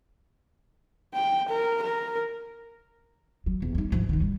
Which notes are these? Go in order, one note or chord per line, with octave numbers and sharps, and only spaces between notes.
G5
A#4
A#4
F#3
E2
G3 D#4
G#2 F3
D#3 D#4
G3